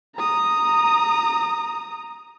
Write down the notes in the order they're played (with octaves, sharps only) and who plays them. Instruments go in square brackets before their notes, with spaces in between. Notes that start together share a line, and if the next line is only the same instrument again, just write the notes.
[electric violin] A#5 D#6